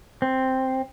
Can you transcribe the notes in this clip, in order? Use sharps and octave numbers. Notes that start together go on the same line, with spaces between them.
C4